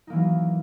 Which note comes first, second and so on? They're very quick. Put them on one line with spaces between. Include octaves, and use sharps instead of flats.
D#4 A#3 E3 F#3